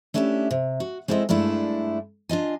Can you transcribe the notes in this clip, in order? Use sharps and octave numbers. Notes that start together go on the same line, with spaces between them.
A3 C#4 D4 E4 F#4 G4
C3
F#4
G#3 C4 E4 A4 C5 D#5
G2 G#3 A3 D4 E4
D4 F4 D#5 G#5